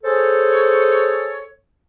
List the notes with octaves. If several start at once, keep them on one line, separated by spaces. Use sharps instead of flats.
G#4 A4 C5 C#5